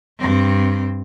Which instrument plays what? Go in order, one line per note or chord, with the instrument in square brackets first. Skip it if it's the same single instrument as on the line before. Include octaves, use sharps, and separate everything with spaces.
[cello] G2 C4